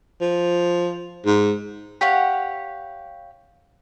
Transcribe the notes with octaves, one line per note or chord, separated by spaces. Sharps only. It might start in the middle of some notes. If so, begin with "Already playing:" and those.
F3
G#2
G4 C#5 F5 F#5